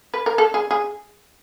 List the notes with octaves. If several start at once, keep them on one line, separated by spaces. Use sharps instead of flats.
B4
A#4
A4
G#4
G#4